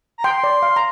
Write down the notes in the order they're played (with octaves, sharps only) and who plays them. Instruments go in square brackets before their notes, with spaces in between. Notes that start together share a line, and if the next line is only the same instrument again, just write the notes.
[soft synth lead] A#5
[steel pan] G5 [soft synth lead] C6
[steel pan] D5
F5
A#5